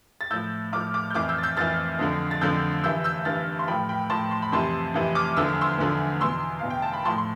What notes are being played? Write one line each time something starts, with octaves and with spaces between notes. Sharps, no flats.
A6
A2 F3 E6 G6
A2 F3 D6 F6
D6 F6
G6
F2 E3 D6 F6
E6 G6
A6
E6 G6
F2 E3 F6 A6
F2 D3 F3
A6
F2 D3 F3 E6 G6
G2 E3 E6 G6
E6 G6
G2 E3 F6 A6
C6
A2 F3 G5 B5
G5 B5
A2 F3 A5 C6
C6
B5
F2 C3 E3 A5 C6
F2 C3 E3
D6 F6
E2 D3 F3 E6
F6
C6 E6
E2 D3 F3
E2 B2 C6 E6
E2 B2 F5
G5
A5
B5
A2 F3 A5 C6
C6